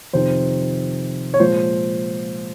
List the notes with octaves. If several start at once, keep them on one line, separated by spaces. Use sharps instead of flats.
F2 C3 D#3 C5
C#5
A#2 F3 G#3 C5